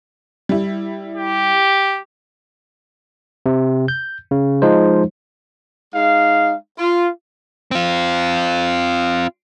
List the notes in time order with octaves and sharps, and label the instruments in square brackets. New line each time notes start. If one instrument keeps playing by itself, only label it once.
[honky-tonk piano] G3 E4
[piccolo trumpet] G4
[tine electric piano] C3
G6
C#3
F3 G#3 D#4 C5
[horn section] G#3 D#4 F5
F4
[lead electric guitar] C4 F4